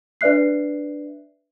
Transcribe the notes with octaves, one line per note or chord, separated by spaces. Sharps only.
D4 B4 D5 E5 F#6 C7